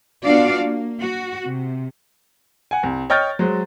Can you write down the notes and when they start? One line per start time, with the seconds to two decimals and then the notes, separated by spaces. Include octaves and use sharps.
0.23 B3 D4 F4 F#4 D5 F5
0.62 A#3
1.01 F#4
1.46 C3
2.71 F#5 G#5
2.83 C2
3.10 C#5 D#5 G5 F6 G6 A6
3.39 F#3 G#3 C5